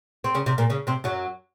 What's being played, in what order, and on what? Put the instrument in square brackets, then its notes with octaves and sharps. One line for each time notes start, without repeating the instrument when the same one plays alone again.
[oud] C4
C#3 C#4
C3 C4
A#2 A#3
C#3 C#4
C3 C4
F#2 F#3